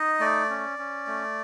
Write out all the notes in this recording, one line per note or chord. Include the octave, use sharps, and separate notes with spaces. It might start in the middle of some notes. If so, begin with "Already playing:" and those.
Already playing: D#4 D#5
A3 D5
C#4
C#4
A3